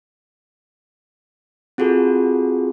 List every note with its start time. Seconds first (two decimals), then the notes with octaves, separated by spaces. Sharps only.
1.78 C4 F4 F#4 G#4 A4